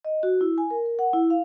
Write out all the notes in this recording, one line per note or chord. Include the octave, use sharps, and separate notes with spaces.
D#5
F#4
E4
G#5
A#4
A#4
F#5
E4
F5